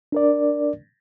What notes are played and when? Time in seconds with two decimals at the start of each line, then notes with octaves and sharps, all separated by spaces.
0.12 D4 A#4 D5